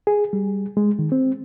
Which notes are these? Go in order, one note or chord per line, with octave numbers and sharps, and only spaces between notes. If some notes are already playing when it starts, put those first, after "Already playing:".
G#4
G3
G#3
D#3
C4